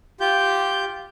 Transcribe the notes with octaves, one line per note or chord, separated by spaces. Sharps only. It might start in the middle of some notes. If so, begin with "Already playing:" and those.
F4 G4 G6